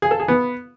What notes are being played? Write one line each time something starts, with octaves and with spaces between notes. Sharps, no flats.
G#4
A4
G#4
B3